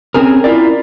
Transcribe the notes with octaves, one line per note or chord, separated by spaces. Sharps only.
C4 C#4 G#4 A#4
E4 F4 A#4 D5